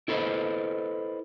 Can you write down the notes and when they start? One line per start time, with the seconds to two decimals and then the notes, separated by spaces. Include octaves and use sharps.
0.08 E4 A4 B4 C5 D#5